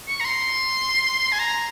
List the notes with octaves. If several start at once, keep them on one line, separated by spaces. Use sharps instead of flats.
C#6
A#5
C6
G#5
A#5